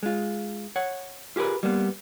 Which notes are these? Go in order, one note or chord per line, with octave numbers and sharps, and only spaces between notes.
G#3 F4
C#5 F#5
F4 G4 G#4 A#4 B4
G3 A#3 B3